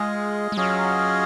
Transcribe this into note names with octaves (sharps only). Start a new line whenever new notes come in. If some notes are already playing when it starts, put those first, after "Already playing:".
Already playing: G#3 F4 G#4 D#5
G#3
F#3 C#4 F4 G#4 D#5